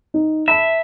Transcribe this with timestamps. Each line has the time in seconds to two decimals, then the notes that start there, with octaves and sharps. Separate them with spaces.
0.14 D#4
0.48 E5 A5 B5